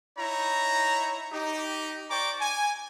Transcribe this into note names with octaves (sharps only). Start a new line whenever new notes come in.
D#4 E4 C#5 A#5
D#4 G4
C5 D5 G5 A#5 C#6 D6
G#5